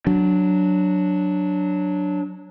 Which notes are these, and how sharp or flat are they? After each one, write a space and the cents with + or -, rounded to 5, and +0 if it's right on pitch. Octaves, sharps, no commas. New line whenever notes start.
F#3 -5 D4 +0